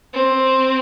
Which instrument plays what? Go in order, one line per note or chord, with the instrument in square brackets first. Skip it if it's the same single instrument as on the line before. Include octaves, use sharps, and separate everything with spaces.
[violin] C4